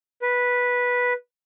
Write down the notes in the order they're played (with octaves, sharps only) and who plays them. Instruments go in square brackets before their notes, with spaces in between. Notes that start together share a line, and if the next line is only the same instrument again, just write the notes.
[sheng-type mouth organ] B4